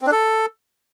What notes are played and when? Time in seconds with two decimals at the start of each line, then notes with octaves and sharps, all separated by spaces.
0.01 C4
0.07 D4
0.12 A4